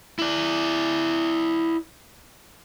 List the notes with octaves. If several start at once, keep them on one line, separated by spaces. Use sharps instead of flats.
E4 D5